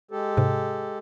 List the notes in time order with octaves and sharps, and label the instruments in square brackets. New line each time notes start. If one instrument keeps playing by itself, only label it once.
[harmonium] G#3 G4 A4
[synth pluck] G#2 C3